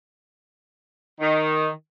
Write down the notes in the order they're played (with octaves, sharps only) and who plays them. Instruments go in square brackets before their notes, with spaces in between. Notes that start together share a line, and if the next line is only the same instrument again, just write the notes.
[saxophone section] D#3